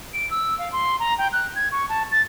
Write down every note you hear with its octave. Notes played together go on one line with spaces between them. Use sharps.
D7
E6
F5
C6
A#5
G5
F#6
G#6
C#6
A5
A6